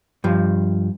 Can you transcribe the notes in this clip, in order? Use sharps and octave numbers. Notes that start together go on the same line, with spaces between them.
G2 F3